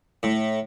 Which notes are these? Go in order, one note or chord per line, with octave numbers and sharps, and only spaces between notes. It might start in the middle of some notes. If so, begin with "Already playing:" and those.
A2